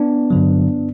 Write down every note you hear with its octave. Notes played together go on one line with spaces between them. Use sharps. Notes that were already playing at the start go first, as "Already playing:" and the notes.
Already playing: B3 D4
G2 D3 F#3